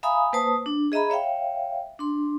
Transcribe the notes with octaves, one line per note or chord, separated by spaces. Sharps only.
E5 F5 G#5 A#5 B5 D#6
A#3 B4 C5 A5 D#6
D4
G#4 D#5 E5 A#5 B5
C#5 E5 F5 G5
D4 C6